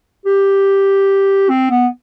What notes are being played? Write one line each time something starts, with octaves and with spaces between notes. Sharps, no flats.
G4
C4
B3